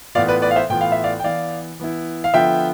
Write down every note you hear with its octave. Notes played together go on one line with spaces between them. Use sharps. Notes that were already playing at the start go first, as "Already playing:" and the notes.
A2 E3 B3 F4 D5 F5
B4 D5
B4 D5
F5
C5 E5
A2 E3 B3 F4 G5
F5
E5
D5 F5
G5
E3 B3 E4 D5 F5
E3 B3 E4
F5
D3 F3 B3 F4 E5 G5